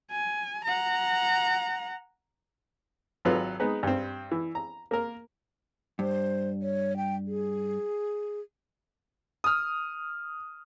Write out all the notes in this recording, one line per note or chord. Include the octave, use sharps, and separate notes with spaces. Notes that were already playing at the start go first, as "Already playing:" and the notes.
G#5
F#5 A#5
G#1 F#3 F4 A4 B4
G#3 B3 D#4 B4
G2 C4
E3
A#5
A#3 A#4
G2 C5
C#5
G5
G#4
D#6 F6